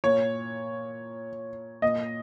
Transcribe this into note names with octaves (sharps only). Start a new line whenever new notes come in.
A#2 C#5
A#2 D#5